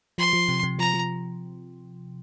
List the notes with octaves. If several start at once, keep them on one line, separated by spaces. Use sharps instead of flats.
F3 C6
F3
C3
C3
F3 A#5
F3